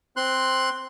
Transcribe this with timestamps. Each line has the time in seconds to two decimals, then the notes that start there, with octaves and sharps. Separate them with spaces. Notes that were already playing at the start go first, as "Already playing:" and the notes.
0.17 C4 C6 F#6